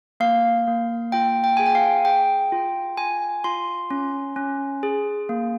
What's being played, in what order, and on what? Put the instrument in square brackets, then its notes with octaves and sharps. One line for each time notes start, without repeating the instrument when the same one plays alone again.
[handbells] A#3 F5
A#3
F4 G5
G5
G#4 G#5
G5
F5
G#4 G5
F4
F4 G#5
F4 C6
C#4
C#4
G#4
A#3